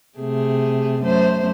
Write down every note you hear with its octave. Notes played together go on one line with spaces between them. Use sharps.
C3 A3 G#4
F#2 A3 C5